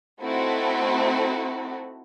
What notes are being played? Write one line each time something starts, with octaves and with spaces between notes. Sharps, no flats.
A3 C4 D#4 E4 F#4 A4